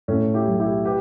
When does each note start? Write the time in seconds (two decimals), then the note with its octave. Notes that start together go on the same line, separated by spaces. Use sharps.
0.08 A2 A3 C#4
0.34 E4 G4
0.47 B1
0.60 E4 G4
0.85 G4 B4